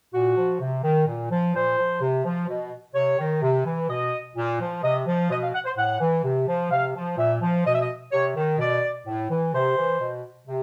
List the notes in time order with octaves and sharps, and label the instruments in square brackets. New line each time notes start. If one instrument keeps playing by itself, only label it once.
[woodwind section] A#2 F#4
F3
C3
D#3
A#2
F3
A#2 C5
F3
C3
F3
B2
C3 C#5
D#3
C3
E3
B2 D#5
A#2
F3
C3 D#5
F3
B2 D#5
F5
F#5
C5
A2 F#5
E3
C3
F3
C3 F5
F3
A#2 E5
F3
B2 D#5
E5
D#5
C3 C#5
D#3
B2 D5
A2
E3
C3 C5
E3
B2
C3